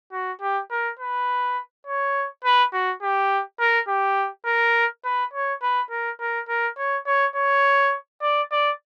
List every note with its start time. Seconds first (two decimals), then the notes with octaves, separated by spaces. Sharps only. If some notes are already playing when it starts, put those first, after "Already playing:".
0.12 F#4
0.41 G4
0.71 A#4
0.99 B4
1.87 C#5
2.45 B4
2.73 F#4
3.02 G4
3.60 A#4
3.88 G4
4.46 A#4
5.04 B4
5.34 C#5
5.62 B4
5.90 A#4
6.20 A#4
6.48 A#4
6.77 C#5
7.06 C#5
7.35 C#5
8.22 D5
8.52 D5